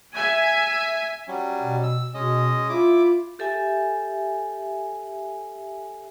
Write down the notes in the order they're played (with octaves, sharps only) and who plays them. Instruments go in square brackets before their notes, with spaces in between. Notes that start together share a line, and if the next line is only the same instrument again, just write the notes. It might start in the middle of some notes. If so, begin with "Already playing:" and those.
[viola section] E5 G#5
[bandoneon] F#3 G3 C#4
[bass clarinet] B2
[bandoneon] E6
[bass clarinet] B2 [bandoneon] G#3 C#4 D#5
[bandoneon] E4 D6 [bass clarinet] F4
[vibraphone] G4 A4 E5 G#5